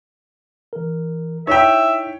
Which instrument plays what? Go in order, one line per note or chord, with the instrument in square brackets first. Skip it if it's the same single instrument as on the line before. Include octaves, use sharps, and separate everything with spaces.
[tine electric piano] E3 A#4
[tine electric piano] D#4 E4 [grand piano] C#5 G5 [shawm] E5